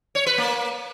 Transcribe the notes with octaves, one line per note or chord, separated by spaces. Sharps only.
C#5
B4
A#3